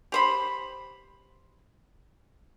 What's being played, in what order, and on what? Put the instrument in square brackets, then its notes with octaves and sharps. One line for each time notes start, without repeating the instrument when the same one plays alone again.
[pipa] G4 C5 B5